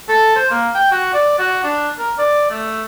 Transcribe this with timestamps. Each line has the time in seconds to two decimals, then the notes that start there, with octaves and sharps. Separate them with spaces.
0.09 A4
0.36 C5
0.51 A#3
0.74 G5
0.91 F#4
1.13 D5
1.39 F#4
1.64 D4
1.98 A#4
2.18 D5
2.51 A3